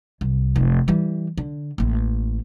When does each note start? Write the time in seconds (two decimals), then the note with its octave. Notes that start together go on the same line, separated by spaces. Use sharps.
0.21 C2
0.56 F1
0.88 E3 G3
1.38 D3
1.78 A1 A#3